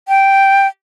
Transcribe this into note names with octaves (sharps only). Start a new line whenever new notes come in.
G5